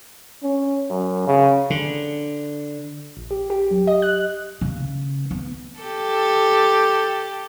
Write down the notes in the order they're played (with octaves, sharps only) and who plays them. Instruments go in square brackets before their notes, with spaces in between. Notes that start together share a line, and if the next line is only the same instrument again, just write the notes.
[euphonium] C#4
F#2
C#3
[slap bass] D3
[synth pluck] A#1
G4
G4
F#2
D#5
F#6
[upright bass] C#3
B3
[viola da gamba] G4 A4